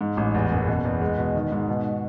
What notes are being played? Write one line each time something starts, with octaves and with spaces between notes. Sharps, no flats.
G#2
A1
E2
F#1
B2
E2
G#3
B2
D#3
G#2
B2